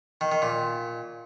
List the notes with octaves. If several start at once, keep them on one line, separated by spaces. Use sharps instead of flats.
D#3
D#3
A#2